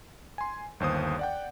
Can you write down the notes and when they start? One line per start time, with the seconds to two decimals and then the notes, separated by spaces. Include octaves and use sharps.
0.38 G#5 C6
0.80 G1 D#2 C5 D#6
1.19 D5 F#5 G5